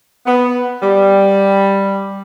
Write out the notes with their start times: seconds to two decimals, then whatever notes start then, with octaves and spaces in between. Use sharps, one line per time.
0.27 B3
0.82 G3